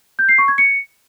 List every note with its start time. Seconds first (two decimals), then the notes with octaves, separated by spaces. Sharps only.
0.19 G6
0.29 C7
0.38 C#6
0.48 G#6
0.58 C#7